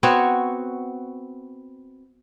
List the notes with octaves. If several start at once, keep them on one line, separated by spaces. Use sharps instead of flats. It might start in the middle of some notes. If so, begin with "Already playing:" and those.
B3 C4 F#4 C#5